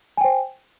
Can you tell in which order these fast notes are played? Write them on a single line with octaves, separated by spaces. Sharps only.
G#5 G5 C5